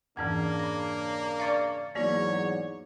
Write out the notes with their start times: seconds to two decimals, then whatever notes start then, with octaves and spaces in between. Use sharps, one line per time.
0.17 F2 G#2 C#3 E3 A#3 D4 G#6
0.59 B5 A#6
1.40 D5 F5 C#6 D6 A6 C#7
1.95 E2 G#2 F#3 A#3 B3 F#4 C#5 D5